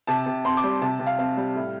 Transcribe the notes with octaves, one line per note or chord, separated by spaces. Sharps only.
C3 A5
C3
C4 C6
D6
G3
C3 A5
C3
F5
C4 F5
G3
A2